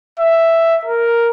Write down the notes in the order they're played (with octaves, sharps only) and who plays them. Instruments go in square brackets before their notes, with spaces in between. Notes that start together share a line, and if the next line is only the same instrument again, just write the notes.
[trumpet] E5
A#4